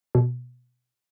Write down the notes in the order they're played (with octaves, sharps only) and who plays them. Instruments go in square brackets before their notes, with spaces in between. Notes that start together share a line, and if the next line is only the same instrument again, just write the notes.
[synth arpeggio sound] B2